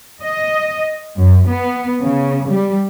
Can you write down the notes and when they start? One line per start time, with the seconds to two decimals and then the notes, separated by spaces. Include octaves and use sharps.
0.22 D#5
1.17 F#2
1.48 B3
2.01 C#3
2.49 G3